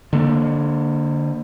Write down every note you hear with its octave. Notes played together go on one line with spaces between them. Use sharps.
D3 A#3